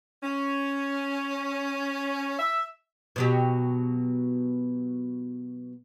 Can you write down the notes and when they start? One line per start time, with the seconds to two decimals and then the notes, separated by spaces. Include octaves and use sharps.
0.23 C#4
2.39 E5
3.16 B2 F#3 G4